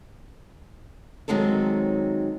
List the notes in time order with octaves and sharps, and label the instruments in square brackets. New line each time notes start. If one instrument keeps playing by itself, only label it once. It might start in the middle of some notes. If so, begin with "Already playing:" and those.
[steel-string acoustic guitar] D#3 F#3 G#3 C4 A4